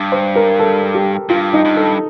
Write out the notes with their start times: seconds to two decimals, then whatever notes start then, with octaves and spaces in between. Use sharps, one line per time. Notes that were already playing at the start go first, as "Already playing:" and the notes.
Already playing: G2
0.12 C5
0.36 A#4
0.59 A4
0.95 G4
1.29 G2 F4
1.53 D#4
1.65 G2
1.77 A4